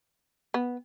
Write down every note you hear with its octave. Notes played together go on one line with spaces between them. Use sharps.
B3